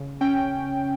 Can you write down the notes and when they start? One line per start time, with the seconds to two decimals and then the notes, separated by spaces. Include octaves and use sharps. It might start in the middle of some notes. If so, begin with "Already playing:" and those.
Already playing: C#3
0.21 C#4 G5